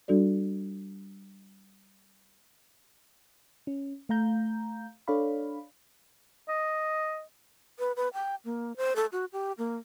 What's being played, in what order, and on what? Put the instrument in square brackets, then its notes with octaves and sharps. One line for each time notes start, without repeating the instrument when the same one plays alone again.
[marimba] G3 D4 F#4 A4 D5
[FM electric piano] C#4
A3 F5 A#5 G6
D4 A4 C#5 D5 F5 B5
[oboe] D#5
[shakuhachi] B4
B4
G5
A#3
C5
A4
F#4
G4
A#3